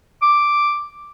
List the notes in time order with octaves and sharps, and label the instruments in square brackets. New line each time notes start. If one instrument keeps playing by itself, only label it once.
[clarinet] D6